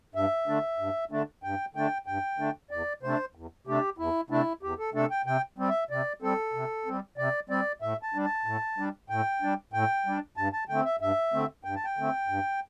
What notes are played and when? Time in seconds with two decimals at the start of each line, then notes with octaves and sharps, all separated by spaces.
0.15 G2 E5
0.47 D3 A3 D4
0.79 G2
1.11 D3 A3 D4
1.43 G2 G5
1.75 D3 A3 D4 G5
2.06 G2 G5
2.38 D3 A3 D4
2.71 E2 D5
3.03 C3 A3 D4 C5
3.35 E2
3.67 C3 A3 D4 G4
3.98 E2 E4
4.30 C3 A3 D4 E4
4.63 E2 G4
4.79 A4
4.94 C3 A3 D4 A4
5.11 G5
5.26 C3 G5
5.58 G3 C4
5.69 E5
5.90 C3 D5
6.22 G3 C4 A4
6.54 C3
6.86 G3 C4
7.17 C3 D5
7.49 G3 C4 D5
7.82 A2 E5
8.03 A5
8.14 G3 D4
8.25 A5
8.46 A2
8.78 G3 D4
9.09 A2 G5
9.42 G3 D4
9.73 A2 G5
10.06 G3 D4
10.37 G2 A5
10.53 A5
10.69 D3 A3 C4 G5
10.85 E5
11.01 G2 E5
11.33 D3 A3 C4
11.64 G2 G5
11.75 A5
11.85 G5
11.97 D3 A3 C4
12.28 G2